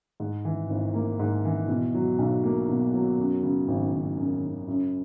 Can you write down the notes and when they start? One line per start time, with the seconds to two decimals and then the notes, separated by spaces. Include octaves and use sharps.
0.20 G#2
0.45 E3
0.69 G#1
0.94 A#3
1.19 G#2
1.45 E3
1.68 B2
1.94 F#3
2.19 B1
2.44 A#3
2.69 B2
2.93 F#3
3.18 F#2
3.43 C#3
3.68 G#1
3.92 G#1
4.17 F#2
4.42 C#3
4.68 F#2